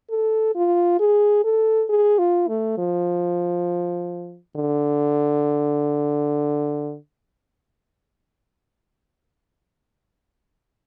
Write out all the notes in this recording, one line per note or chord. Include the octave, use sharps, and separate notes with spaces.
A4
F4
G#4
A4
G#4
F4
A3
F3
D3